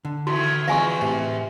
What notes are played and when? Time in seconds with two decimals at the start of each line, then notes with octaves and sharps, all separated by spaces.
0.05 D3
0.27 A2 D#3 E3 F#4
0.68 E2 F3 G#3 C4 F5 G#5 C#6
1.01 A2 C3